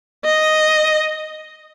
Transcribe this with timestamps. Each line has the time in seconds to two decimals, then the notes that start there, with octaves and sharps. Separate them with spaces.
0.25 D#5